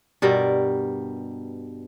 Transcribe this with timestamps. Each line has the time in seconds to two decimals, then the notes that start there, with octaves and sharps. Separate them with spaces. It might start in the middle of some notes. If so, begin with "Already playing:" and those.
0.22 G2 B2 G3 A#4